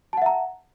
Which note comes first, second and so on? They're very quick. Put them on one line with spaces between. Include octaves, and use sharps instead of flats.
A5 F#5 E5 A#5